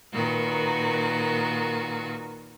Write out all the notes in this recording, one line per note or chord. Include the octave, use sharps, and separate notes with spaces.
A#2 D#3 F#4 B4